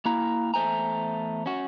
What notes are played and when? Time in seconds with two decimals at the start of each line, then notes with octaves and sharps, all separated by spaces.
0.05 A#3 E4 A#5
0.54 E2 A3 C5 G#5 A#5
1.46 C#4 F#4